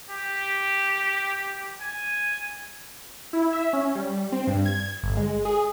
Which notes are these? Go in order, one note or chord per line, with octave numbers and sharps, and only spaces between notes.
G4
G#5
E4
E5
C#4
G3
C4
G2
G#6
G1
G#3
G#4